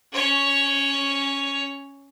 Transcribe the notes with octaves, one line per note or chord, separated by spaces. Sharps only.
C#4 C#5